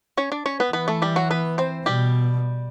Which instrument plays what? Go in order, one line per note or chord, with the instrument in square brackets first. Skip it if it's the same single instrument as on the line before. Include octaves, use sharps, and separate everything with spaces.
[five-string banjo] C#4 C#5
D4 D5
C#4 C#5
B3 B4
[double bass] E3 [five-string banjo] B3 B4
[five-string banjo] A3 A4
G3 G4
F#3 F#4
B3 B4
C4 C5
[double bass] B2 [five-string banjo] G3 G4